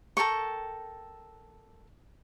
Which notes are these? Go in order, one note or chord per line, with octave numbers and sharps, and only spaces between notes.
A4 A#4 G5 C#6